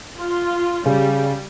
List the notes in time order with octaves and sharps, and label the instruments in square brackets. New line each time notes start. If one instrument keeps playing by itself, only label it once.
[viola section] F4
[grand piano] C#3 [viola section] G3